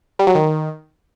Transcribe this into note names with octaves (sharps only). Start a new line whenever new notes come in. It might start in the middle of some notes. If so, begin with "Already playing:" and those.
G3
F#3
D#3